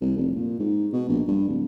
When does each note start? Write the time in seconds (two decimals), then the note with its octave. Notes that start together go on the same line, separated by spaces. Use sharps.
0.01 C2
0.17 F1
0.36 A#2
0.59 G#2
0.93 B2
1.09 A#1
1.28 G2
1.48 D1